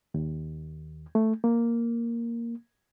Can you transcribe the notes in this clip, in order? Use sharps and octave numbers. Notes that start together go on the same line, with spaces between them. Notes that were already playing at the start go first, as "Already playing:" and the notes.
D#2
A3
A#3